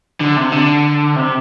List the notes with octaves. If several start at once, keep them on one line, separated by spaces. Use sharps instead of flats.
D3
C3
D3
C3